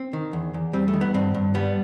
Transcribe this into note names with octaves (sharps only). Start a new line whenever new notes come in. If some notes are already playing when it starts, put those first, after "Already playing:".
Already playing: C4
D#3
E2
E2
G3 C4
A3
D#3
B3
G2 C4
G2
G3 B3